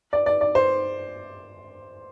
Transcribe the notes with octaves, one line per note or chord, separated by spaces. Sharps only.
D5
D5
D5
C5